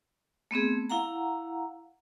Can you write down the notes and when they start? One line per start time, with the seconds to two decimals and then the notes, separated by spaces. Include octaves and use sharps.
0.51 A3 B3 C4 G#4
0.90 E4 F5 F#5 A#5